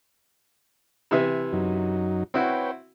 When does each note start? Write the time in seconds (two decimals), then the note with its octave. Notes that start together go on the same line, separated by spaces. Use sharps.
1.11 C3 E3 E5
1.53 F#2 F#3 D#4
2.34 C4 E4 F#4 B4 C#5 G5